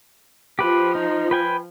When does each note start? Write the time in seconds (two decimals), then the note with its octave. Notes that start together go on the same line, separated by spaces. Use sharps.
0.59 F3 G4 B4
0.95 D#4
1.31 B4 G5 G#5